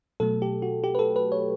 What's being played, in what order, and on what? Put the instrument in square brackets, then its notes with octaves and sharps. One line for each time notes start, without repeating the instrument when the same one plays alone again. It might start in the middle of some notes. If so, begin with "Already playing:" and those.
[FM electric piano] B2 F#3 A3 A4
G4
F#4
G4
B4
A4
B4
C#5